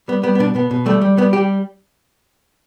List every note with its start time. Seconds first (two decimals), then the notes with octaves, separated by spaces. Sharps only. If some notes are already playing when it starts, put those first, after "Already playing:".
0.08 G3 B3
0.23 G3 B3
0.35 B3
0.39 B2 D4
0.55 B2 B3
0.71 B2
0.86 G3 A3
1.01 G3
1.17 G3 B3
1.33 G3 G4